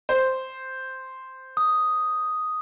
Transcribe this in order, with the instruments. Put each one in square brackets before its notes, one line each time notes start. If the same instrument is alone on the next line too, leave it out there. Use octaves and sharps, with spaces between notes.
[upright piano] C5
[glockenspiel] D#6